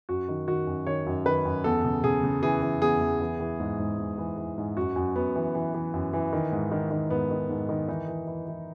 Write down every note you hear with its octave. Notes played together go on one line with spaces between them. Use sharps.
F#2 F#4
D#3
D#3 F#4
F#2
D#3 C#5
F#2
D#3 B4
F#2
E2 A4
C#3
C#3 G#4
C#3
E3 G#4
E3
E2 G#4
E2
E3
E3
G#2
G#2
G#2
E3
E3
G#2
F#2 F#4
F#2
F#2 B3
E3
E3
E3
F#2
E3
D#3
G#2
D#3
D#3
G#2 B3
D#3
G#2
D#3
E3 D#4
E3
E3
E3